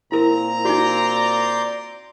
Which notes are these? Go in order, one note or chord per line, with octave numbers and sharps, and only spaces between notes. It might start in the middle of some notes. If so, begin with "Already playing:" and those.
A#2 C4 E4 A#4 A#5
D#4 F#4 D5 C6 G6